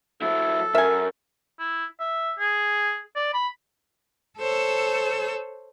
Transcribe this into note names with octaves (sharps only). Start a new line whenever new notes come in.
F#3 E4 A4
F#2 A#4 E5 G#5
E4
E5
G#4
D5
B5
A4 C5 C#5 E6